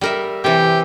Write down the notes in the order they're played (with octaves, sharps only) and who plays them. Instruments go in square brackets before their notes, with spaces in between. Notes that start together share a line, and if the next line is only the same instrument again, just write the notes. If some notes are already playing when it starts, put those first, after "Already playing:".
[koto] G3 A#4 E5
[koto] C3 E3 [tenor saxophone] G4